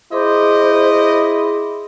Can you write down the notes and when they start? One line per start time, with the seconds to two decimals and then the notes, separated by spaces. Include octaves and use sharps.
0.12 E4 G#4 C5 D#5 C6 D6